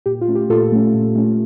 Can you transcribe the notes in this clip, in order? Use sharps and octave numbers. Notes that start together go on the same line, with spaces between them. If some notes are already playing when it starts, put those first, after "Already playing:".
A#2 G4
F4
A3 C#4
G4
A#2 F4 A4
A3 C#4
A#2
A3 C#4